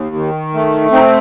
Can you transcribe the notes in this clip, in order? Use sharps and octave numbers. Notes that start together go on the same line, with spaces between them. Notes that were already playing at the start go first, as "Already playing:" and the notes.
Already playing: D#2
D#3
A3
C4 D#4